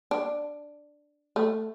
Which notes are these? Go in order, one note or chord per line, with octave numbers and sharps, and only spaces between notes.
D4
A3